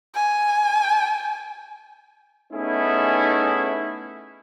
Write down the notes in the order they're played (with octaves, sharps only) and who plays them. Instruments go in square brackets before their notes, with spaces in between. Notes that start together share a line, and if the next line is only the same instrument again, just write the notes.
[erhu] G#5
[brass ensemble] A3 B3 C#4 D#4 E4 G#4